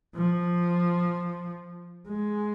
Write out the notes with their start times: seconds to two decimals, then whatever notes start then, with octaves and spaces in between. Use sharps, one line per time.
0.16 F3
2.09 G#3